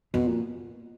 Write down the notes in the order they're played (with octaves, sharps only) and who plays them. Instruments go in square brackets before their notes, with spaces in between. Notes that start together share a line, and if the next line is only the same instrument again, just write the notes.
[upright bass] F2 [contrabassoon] B2
[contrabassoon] A#2